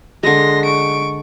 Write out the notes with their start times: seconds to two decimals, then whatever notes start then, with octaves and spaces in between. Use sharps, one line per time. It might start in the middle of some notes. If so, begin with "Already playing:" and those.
0.23 D3 G#3 C6 A#6
0.64 C#6 D7